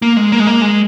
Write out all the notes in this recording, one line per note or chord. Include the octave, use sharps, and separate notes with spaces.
A#3
G#3
A#3
G#3
A#3
G#3